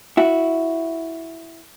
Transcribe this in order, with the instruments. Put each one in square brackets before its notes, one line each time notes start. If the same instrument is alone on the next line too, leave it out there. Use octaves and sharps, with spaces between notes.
[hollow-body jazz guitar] E4 F#4